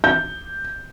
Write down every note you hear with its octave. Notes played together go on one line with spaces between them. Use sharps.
G6